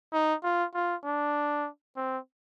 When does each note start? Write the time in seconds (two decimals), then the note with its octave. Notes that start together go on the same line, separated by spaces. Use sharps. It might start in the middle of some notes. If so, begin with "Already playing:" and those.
0.13 D#4
0.43 F4
0.74 F4
1.05 D4
1.96 C4